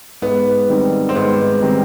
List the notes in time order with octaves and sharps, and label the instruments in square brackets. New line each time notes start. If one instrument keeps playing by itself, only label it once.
[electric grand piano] G#2 [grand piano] B3
[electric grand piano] D#3 G3 C4 D#4
[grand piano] C4
[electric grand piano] G#2 [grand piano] B3
[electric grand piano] D#3 G3 C4 D#4